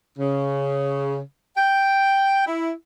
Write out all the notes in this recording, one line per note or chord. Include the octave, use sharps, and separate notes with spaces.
C#3
G5
E4